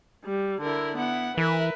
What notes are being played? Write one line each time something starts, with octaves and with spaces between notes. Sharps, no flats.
G3
D3 E4 A#4
B3 E4 F#5
E3 A#4 B4 E5